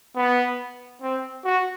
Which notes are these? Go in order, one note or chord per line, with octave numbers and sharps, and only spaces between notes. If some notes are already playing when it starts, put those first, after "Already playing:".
B3
C4
F#4